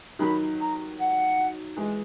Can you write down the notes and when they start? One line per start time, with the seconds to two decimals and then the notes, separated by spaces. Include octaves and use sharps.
0.19 D#3 F#3 B5
0.60 A#5
0.99 F#5
1.76 E3 G#3